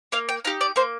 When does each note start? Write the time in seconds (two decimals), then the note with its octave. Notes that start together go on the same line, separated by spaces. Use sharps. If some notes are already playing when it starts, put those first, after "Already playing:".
0.12 A#3 F5
0.29 G5
0.45 D#4 G4 F5
0.61 D5
0.76 A#3 C5